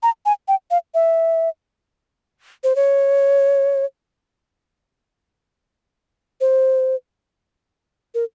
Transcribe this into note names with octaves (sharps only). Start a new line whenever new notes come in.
A#5
G#5
G5
F5
E5
C5
C#5
C5
A#4